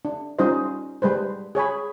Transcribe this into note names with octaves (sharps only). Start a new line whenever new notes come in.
D4
G3 C#4 D#4 F4 C5 D#5
G3 G#3 B4 C5
G#4 C#5 G#5 B5